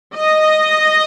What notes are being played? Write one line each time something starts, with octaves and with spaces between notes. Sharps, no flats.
D#5